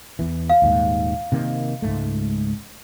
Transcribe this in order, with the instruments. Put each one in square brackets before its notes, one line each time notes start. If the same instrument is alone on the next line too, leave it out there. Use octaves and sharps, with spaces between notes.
[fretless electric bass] E2 E3
[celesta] F5
[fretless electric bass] D#1 D#2 G#2
C3 D#3 A#3
C#2 G#2 A3